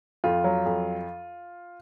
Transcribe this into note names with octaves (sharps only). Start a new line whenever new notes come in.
F2 F4
F#3
F2